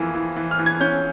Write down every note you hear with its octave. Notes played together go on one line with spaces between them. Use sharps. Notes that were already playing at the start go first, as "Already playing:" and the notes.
Already playing: F2 E3 A#3
E3
E3
F6
E3
G#6
C#4 G6